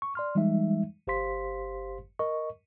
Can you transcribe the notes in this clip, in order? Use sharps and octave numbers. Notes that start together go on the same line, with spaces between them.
C#6
D5 C6 F6
E3 G3 G#3 D#4 E5
G1 G4 C5 F5 C6 B6
A#4 D#5 C#6